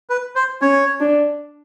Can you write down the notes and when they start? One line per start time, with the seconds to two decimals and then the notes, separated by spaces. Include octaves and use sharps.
0.10 B4
0.35 C5
0.61 C#4 C#5
1.00 D4